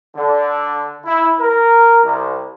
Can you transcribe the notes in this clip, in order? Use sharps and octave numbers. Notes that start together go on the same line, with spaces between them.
D3
E4
A#4
C2